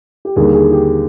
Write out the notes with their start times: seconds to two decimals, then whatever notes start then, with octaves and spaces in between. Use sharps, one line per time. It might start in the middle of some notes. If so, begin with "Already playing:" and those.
0.25 G4
0.36 D#2 D3 G3 A#3 G#4
0.54 G#4
0.71 G4